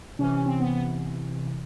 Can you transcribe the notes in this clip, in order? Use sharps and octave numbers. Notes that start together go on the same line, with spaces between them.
C3 E3 C#4
C#4
C4
B3
B3